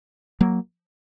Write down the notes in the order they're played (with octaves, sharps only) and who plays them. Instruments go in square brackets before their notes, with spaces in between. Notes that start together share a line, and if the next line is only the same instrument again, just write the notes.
[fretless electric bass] F#3 A#3